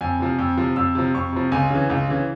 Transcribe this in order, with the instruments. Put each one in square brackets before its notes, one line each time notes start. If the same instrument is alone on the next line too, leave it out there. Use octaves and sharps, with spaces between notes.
[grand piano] F2 G#5
C3 F3
F2
C3 F3
F2 E6
C3 F3
F2 C#6
C3 F3
C#2 G#5
C#3 E3
C#2
C#3 E3